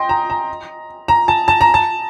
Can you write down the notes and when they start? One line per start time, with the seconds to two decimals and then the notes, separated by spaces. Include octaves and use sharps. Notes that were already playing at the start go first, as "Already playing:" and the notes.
Already playing: D#5 G5 C6
0.09 A#5
0.30 A#5
1.08 A#5
1.28 A5
1.48 A5
1.61 A#5
1.74 A5